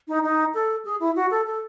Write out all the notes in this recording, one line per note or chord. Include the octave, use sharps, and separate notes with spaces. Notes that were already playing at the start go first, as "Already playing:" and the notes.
D#4
D#4
A4
G#4
E4
F#4
A4
A4